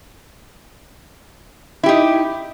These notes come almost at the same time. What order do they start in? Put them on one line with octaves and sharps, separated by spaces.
E4 G4 D#4